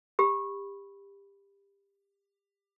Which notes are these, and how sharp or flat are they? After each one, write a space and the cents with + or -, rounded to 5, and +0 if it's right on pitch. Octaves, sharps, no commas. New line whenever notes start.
G4 +25 B5 +0